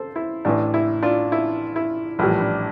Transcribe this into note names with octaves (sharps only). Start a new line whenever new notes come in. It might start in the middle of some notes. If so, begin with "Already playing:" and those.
Already playing: A4 C5
E4
A1 A2 E3 D4
E4
D4 F4
E4
E4
A#1 A2 E3 G3 E4
D4